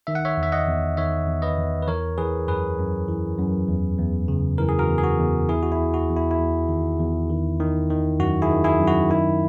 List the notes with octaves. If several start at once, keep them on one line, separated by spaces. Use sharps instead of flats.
D#3 E5
F#5
C#5 E5
E2
E5
D#5 F#5
E2
D#3 C#5 E5
E2
B4 D#5
E2
B4
E3 A#4 C#5
E3 G#4 B4
F#2 G#4 B4
F#2
E3
F#2
E2
E2
C#3
E3 A#4
G#4
F#4 A#4
E2
G#4
F#4
E2
E2 E4 G#4
F#4
E4
E2
F#4
E2
E4
E4
E2
D#3
E2
D#3
D#3
D#3
F#2 F#4
E4 G#4
D#3
E4 G#4
F#2
F#4
D#3 E4